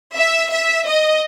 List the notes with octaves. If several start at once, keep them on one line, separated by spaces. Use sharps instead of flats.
E5
E5
D#5